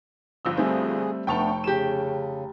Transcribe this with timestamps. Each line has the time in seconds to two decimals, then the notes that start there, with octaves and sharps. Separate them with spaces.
0.45 G1 F3 E6
0.57 G3 A3 C4 G#4
1.27 F1 A3 B3 D4 G5 A5 C#6 F7
1.64 C#3 G4 E7